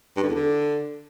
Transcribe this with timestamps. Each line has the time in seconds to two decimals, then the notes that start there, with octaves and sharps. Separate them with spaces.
0.17 G2
0.23 D3
0.29 E2
0.35 D3